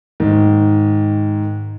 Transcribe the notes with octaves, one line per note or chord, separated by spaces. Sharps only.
G#2 D#3